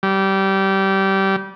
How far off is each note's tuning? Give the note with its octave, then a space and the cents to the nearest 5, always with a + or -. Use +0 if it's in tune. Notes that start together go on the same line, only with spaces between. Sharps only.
G3 -20